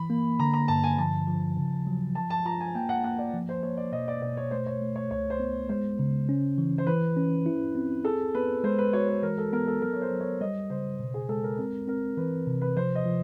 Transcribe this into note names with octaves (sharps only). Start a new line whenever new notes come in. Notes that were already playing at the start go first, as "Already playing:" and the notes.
Already playing: E3 B5
A#3
D3 A#5
A#5
G2 A5
G#5
F3 A5
F3
C#3
F#3
F3 A5
A5
F4 A#5
G#5
A#3 G5
F#5
A#3 F#5
D5
F3
C5
A#3 C#5
D5
B2 D#5
D5
B2 D5
C#5
A3 C5
C#5
A3
C#5
C#2 C#5
C5
B3
G#3 C5
C#3
C#4
E3
C5
E3 B4
C#4
E4
C4
G#4 A4
B3 B4
G#3 C5
B4
F#4 C#5
B4
E3 A#4
A4
B3 A#4
A4
F#3 A#4
C#5
C5
F#3
C#5
G3 D#5
C#3 C5
B2
G#4
G#3 A4
A#4
C4 A#4
C4 A#4
E3 B4
C3
B4
F3 C5
D#5
F3